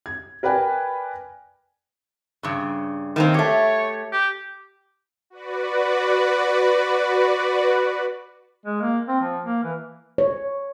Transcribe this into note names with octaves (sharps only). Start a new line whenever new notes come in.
G#6
A#4 B4 D5 G5 G#5
G2 C#3
D#3 A#3 C4
A3 G4 C#5
G4
F#4 B4 D5
G#3
A#3
C4
F3
A#3
E3
C#5